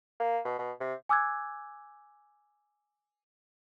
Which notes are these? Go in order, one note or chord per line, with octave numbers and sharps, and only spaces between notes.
A#3
B2
B2
C3
G#5 D6 E6 F#6 G#6